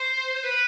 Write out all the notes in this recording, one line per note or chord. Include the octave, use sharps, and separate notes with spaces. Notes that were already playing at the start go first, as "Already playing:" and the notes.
Already playing: C5
B4